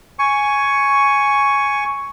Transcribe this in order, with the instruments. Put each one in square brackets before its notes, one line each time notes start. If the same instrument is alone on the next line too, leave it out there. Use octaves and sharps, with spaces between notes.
[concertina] G#5 C#6